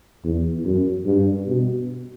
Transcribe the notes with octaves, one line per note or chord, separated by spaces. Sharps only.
E2
F#2
G2
B2